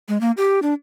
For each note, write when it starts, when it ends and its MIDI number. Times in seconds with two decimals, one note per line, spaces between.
0.08 0.20 56
0.21 0.31 58
0.37 0.59 67
0.62 0.74 62